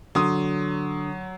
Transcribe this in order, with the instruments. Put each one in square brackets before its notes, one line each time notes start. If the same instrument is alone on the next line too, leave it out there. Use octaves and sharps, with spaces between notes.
[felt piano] D3 D#6 [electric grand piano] F#3 C6